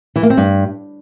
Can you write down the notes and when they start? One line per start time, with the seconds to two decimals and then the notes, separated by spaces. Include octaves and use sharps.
0.16 E3
0.23 A#3
0.30 C4
0.37 G2